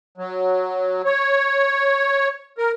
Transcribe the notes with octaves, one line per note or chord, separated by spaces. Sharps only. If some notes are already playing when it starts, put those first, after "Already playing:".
F#3
C#5
A#4